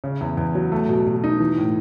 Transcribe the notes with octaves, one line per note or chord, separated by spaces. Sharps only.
C#3
E2
E2
F#3
A3
B2
B2
D#4
E3
A2